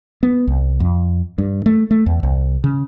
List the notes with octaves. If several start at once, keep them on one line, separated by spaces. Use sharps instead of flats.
B3
C2
F2
G2
A3
A3
E2
C2
C#3